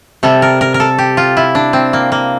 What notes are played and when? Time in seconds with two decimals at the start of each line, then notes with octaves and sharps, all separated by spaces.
0.23 C3 G3 A4
0.42 A#4
0.61 A#4
0.74 A#4
0.80 A4
0.98 G4
1.17 F4
1.37 E4
1.55 D4
1.73 C4
1.93 A#3
2.12 A#3